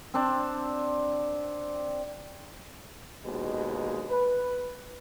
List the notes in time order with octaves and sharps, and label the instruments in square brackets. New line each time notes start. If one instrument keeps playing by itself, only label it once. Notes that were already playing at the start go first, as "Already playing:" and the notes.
[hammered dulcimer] C4 D4
[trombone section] A#1 D#2 B2 G#3
B4